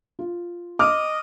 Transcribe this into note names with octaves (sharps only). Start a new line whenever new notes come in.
F4
D#5 D6 F6